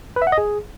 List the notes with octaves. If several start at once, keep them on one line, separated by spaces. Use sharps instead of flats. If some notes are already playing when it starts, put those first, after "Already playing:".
B4
E5
F#5
D#5
G#4